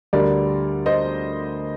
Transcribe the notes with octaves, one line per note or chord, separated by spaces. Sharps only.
D2 D3 G3 A#4 D5
C5 D#5